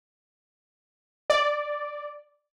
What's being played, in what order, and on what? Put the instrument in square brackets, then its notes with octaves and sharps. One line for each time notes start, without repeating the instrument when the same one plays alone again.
[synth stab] D5